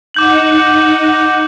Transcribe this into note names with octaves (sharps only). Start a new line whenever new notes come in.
D#4 F#5 D6 G6 F#7